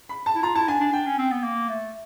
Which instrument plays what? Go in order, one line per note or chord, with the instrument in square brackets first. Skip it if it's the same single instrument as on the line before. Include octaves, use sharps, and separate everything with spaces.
[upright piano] B5
A5
[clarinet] E4
[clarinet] F4 [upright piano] A#5
[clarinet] E4 [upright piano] A5
[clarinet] D4 [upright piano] G#5
[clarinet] D4 [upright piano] G#5
[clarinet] D4 [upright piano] G5
[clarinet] C#4
C4
B3
A#3
A3